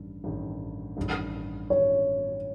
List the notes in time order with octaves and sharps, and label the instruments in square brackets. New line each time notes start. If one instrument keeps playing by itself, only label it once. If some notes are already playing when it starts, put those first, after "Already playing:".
Already playing: [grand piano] A1 G2 D#3
A1 G2 D#3
A1 G2 D#3
[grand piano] A1 G2 D#3 [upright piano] C#5